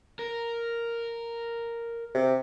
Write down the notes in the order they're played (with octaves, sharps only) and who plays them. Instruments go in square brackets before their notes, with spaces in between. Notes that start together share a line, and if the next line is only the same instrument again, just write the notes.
[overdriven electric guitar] A#4
[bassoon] C3